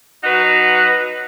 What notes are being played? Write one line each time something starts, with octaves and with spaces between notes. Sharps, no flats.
F#3 D#4 F#4 B4